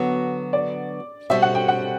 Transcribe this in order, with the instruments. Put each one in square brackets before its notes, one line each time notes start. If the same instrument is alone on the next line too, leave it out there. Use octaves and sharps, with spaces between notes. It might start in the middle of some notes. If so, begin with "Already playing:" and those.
Already playing: [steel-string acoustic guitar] D3 F#3 B3 F#4
[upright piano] D5
[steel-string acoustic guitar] B2 G3 C4 F#4 [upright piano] E5
[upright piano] F#5
G5
F#5